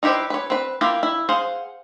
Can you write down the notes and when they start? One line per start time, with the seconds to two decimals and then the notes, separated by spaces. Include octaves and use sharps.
0.03 D#4 E4 G4 B4 C5
0.30 B4 C#5
0.50 C4 B4
0.81 A#3 E4 F4 G4
1.03 E4
1.29 G#4 C5 F5 F#5